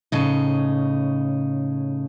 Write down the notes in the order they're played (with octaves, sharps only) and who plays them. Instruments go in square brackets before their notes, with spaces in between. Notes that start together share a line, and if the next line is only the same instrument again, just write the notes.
[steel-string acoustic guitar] A2 C#3 D#4